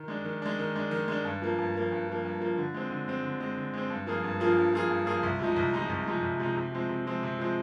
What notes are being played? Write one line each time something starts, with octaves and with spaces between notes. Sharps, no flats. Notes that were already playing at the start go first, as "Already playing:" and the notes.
Already playing: D#3
G#3 D4
D#3
G#3 D4
D#3
G#3 D4
D#3
G#3 D4
G2
F3 A#3
G2
F3 A#3
G2
F3 A#3
G2
F3 A#3
D3
G#3 C4
D3
G#3 C4
D3
G#3 C4
D3
G#3 C4
G2
F3 A#3 F4 G#4
G2
F3 A#3 F4 G#4
G2
F3 A#3 F4 G#4
G2
F3 A#3 F4 G#4
C2
C3 F3 G#3 D#4
C2
C3 F3 G#3 D#4
C2
C3 F3 G#3 D#4
C2
C3 F3 G#3 D#4
C3
F3 G#3 C4
C3
F3 G#3 C4
C3
F3 G#3 C4